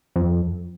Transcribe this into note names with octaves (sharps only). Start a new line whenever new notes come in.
F2